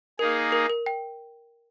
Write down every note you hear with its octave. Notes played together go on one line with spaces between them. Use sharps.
A#3 D#4 G#4 A#4
A#4
A#4
G5